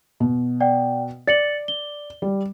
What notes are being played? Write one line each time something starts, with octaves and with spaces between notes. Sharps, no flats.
B2
D5 F#5 G5
D5 A6 C#7 F#7
G7
G3